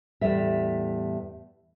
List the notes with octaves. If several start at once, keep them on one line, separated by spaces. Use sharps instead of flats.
E2 A2 E3 G3 E5